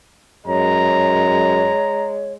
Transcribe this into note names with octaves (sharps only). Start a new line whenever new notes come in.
F#2 G#3 C#5 A#5